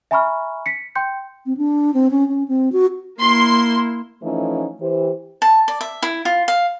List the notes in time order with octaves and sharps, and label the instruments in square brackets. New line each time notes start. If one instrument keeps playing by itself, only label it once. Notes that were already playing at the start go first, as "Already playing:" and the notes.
[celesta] E5 G#5 A#5 B5 C#6 F6
B6 C#7
G5 C6 G6 C#7
[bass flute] C4
D4
C4
C#4
C#4
C4
F#4
[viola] A#3 E4 [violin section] C6
[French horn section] E3 F3 A3 C#4 D#4 E4
E3 G4 C5
[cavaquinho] A5
D5
E5
E4
F4
F5